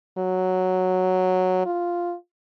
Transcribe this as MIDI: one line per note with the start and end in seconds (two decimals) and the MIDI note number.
0.18 1.62 54
1.66 2.14 65